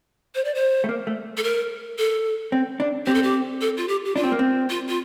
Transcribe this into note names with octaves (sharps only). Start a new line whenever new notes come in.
C5
D5
C5
A3
A#3
A3
A4
A#4
A4
C4
D4
C4 G4
A4
G4
A4
F4
G4
G4
D4 F4
C4
A#3
C4
F4
F4